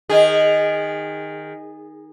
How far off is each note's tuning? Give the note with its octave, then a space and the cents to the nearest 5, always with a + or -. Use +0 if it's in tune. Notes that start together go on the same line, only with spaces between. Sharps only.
D#3 +0 G#4 -25